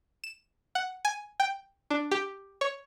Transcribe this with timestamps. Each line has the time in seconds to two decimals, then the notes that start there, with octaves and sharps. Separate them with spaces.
0.24 E7
0.75 F#5
1.05 G#5
1.40 G5
1.90 D4
2.11 G4
2.61 C#5